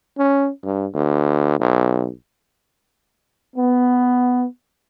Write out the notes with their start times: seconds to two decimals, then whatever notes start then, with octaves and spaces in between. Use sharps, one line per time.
0.18 C#4
0.64 G2
0.94 D2
1.60 B1
3.56 B3